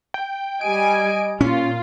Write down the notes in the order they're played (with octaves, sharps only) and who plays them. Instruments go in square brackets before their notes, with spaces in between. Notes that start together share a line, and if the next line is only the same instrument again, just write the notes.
[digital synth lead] G5
[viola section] G3 G#5 [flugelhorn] D#5 [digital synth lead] D7
[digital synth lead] A#2 [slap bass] C#4 [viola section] F4